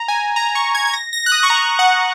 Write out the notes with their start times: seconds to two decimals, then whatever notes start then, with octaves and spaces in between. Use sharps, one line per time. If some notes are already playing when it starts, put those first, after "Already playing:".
Already playing: A#5
0.08 G#5
0.36 A#5
0.55 C#6
0.74 G#6
0.87 G#6
0.93 A#6
1.13 A#6
1.26 F#6
1.32 D#6
1.43 C#6
1.50 A#5
1.79 F#5